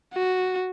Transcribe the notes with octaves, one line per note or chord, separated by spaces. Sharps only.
F#4